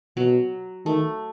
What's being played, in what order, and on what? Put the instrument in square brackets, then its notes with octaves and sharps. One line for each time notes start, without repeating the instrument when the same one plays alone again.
[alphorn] B2 [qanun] F#3
[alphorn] D#3 [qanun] A3